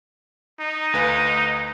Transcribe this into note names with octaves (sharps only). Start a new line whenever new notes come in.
D#4
D2 B4 F5